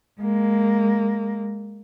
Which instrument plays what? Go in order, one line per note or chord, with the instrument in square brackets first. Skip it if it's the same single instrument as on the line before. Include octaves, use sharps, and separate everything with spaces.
[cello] G#3 A#3